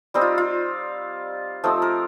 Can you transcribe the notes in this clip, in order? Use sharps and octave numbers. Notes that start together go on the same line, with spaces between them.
G3 C4 D#4 G4
F4
F4
F3 A3 C4 D#4 G4
A#4